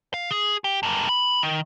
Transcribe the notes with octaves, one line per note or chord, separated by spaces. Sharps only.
F5
G#4
G4
G2 A#3
B5
D#3